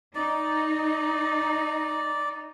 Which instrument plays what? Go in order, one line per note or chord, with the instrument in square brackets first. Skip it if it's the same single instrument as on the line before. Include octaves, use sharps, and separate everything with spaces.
[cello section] D#4 [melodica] D5